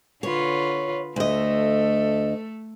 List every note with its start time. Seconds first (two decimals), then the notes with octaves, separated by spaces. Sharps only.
0.23 D3 F4 B4 C#5
1.16 D2 A3 A4 D#5